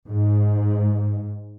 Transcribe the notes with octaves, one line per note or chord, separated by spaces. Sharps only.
G#2